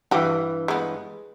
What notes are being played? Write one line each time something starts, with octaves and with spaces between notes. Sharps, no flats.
G2 E3 F#4 G4
G#3 B3